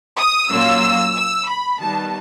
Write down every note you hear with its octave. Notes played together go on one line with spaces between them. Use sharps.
D#6
A#2 F#3 A#3 C#4 F4 E6
E6
B5
D#3 G3 B3 A5